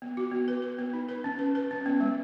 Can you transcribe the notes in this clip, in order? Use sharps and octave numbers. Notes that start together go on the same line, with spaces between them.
B3
F#4
B3
B4
B4
B3
D#4
B4
C#4
B4
B4
C#4
B3
G#3